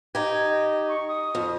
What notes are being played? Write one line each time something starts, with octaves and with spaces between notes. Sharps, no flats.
D#4 G4 G#6
D#5
C#6
D#6
F2